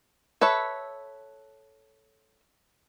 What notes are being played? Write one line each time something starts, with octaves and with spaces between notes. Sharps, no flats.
A4 B4 C#5 E5